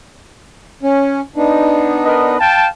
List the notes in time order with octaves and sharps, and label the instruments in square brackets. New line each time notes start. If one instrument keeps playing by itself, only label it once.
[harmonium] C#4
B3 D4 D#4
[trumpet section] A#4 B4 D#5
F5 G5 A5